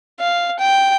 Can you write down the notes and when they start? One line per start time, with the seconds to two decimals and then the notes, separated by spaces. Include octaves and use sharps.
0.20 F5
0.60 G5